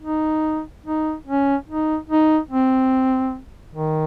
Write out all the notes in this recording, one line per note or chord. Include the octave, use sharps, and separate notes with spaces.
D#4
D#4
C#4
D#4
D#4
C4
D#3